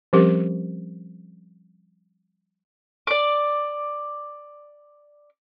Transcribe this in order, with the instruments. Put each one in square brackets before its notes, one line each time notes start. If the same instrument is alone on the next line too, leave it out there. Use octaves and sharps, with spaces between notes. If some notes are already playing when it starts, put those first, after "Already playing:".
[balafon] F3 G3 C4 C#4 G4 A#4
[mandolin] D5 D6